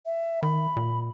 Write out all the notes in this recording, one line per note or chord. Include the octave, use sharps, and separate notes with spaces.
E5
D#3 B5
A#2